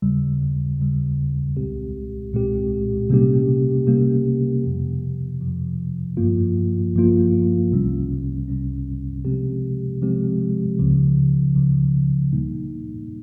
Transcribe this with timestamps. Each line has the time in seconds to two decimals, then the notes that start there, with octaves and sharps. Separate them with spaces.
0.02 D#2 C#3 G3
0.79 D#2 C#3 G3
1.56 C2 A#2 G#3 C4 G4
2.33 C2 A#2 G#3 C4 G4
3.10 C3 G3 A#3 C#4 G4
3.87 C3 G3 A#3 C#4 G4
4.64 F2 C3 F3
5.41 F2 C3 F3
6.17 G1 G2 F3 A#3 F4
6.94 G1 G2 F3 A#3 F4
7.71 C2 C3 G3 C#4
8.48 C2 C3 G3 C#4
9.25 C3 F3 G#3 C4 G4
10.02 C3 F3 G#3 C4 G4
10.79 C#2 C#3 F3
11.55 C#2 C#3 F3
12.32 A#2 G3 A#3 D#4